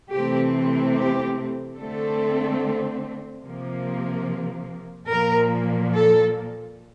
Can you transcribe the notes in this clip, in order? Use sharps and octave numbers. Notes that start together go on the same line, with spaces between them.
C3 E3 A3 C4 G4
G4
D3 A3 C4 A4
C3 F3 A#3
A#2 F3 A#3 A#4
A4